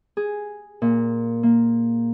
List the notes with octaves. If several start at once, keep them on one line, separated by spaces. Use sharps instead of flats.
G#4
A#2
A#3